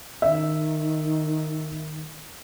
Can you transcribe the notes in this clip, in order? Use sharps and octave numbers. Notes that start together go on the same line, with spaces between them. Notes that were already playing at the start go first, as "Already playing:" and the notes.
D#3 E5